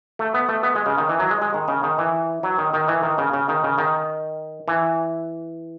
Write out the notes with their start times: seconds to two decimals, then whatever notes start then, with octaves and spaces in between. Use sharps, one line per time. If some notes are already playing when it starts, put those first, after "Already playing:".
0.19 A3
0.34 B3
0.49 A3
0.63 B3
0.75 G#3
0.86 C#3
0.98 D#3
1.09 E3
1.20 F#3
1.30 G#3
1.42 G#3
1.54 D#3
1.68 C#3
1.83 D#3
1.98 E3
2.43 F#3
2.58 D#3
2.74 D#3
2.88 E3
3.03 D#3
3.18 C#3
3.33 C#3
3.49 D#3
3.64 C#3
3.78 D#3
4.68 E3